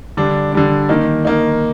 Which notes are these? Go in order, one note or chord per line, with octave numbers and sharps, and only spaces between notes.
D3 G3 D4
D3 G3 D4
D#3 A#3 D#4
D#3 A#3 D#4